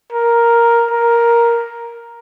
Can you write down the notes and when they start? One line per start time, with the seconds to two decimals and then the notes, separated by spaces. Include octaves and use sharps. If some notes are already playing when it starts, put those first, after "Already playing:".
0.12 A#4
0.91 A#4